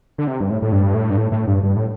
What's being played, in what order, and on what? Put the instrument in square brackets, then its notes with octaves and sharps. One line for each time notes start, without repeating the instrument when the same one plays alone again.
[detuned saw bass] D3
C3
G2
A2
A2
G2
A2
G2
A2
A2
G2
G2
A2